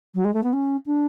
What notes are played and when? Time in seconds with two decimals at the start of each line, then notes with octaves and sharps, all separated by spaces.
0.14 F#3
0.24 G#3
0.33 A3
0.43 B3
0.53 C#4
0.86 D4